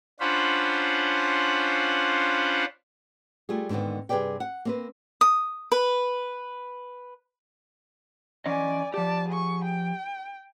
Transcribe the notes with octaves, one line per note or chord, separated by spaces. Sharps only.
C#4 D4 F4 C5 F#5 B5
G3 A3 F4 G#4
G#2 D3 D#3 B3 C4
G2 C3 G#4 B4 D5 G5
F#5
A#3 C4 B4
D#6
B4
E3 C#4 D5 D#5 G#5
F3 G4 D5 A5
G#4 C#6
G5